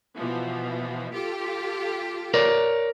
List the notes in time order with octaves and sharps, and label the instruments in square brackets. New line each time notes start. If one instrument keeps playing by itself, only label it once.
[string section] B2 E3 F3
F4 G4 A4
[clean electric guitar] A#4 C#5 D5